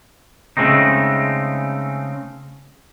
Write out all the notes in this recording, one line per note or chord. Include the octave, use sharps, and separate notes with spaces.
C#3 G#3 A3 C4 D#4